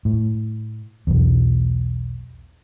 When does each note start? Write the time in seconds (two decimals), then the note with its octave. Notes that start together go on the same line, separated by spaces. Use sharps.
0.05 A2
1.07 B1 E2